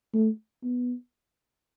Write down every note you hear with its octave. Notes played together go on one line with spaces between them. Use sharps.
A3
B3